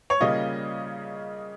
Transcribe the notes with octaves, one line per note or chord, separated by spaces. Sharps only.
C#5
C#3 G3 A#3 C#4 F4 D#5